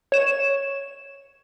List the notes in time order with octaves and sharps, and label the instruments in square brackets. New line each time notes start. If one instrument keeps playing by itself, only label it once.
[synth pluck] C#5 E7